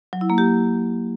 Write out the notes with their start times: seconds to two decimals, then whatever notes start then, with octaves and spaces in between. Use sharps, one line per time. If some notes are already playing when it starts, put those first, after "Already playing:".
0.13 F#3
0.21 E4
0.30 A#3
0.38 G4